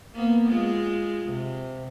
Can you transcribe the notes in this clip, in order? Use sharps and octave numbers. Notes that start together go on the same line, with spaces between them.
A#3 B3
G#3 F4
C3